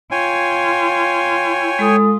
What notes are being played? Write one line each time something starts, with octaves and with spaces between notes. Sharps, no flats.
F4 C#5 G5 G#5
G#3 A4 D#6